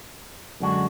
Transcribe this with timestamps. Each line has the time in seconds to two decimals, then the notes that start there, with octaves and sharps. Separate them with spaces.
0.60 F#2 D3 G#3 D4 F#4